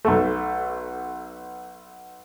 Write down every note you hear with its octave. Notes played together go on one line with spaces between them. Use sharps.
B1 A3